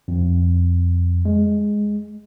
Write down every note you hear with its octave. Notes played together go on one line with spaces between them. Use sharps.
F2
G#3